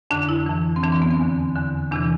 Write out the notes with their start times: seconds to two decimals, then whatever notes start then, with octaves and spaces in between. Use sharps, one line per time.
0.11 F2 D3 D4
0.29 E4
0.46 F2 E3
0.76 C4
0.83 F2 E3 D4
0.92 C4
1.02 B3
1.11 C4
1.20 E2 D3
1.55 E2 D3
1.92 E2 C3 E3 D4